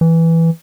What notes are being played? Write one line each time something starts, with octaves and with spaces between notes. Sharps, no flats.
E3